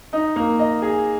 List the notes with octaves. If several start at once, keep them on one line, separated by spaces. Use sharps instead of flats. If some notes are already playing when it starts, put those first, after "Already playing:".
D#4
A#3
D#5
G#4